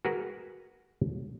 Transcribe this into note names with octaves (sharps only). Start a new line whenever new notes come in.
F#4 G#4 A#4 B4 F#5